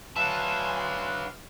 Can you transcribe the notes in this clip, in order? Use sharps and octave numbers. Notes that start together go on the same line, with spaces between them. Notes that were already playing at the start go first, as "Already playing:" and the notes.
F#3 D4 B4 E5 F5 G#5 A5 C6